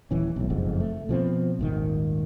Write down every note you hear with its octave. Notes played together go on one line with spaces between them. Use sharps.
D#1 E3 C#4
B1 A2
F#1 F2 G#2
A3
B2 F3 C4
D#1 G#1 D#3